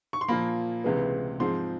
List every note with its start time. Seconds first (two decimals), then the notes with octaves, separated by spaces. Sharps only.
0.13 C#6
0.21 C6
0.28 A#2 F3 A#3 B5
0.84 C#2 C3 E3 G#3 B3
1.40 G#2 F3 G#3 C4 C6